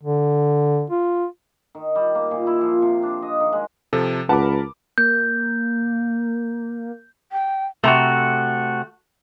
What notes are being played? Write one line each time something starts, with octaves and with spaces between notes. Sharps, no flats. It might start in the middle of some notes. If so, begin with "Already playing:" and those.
D3
F4
D#3
G3
A#3
A#2
E4
F3
C3
D4
D#5
D#3
G#3
C3 F3 A4
C#2 A#4 B4 F#5 A5 B5 D6
A#3 G6
G5
C3 A3 F#4 A#5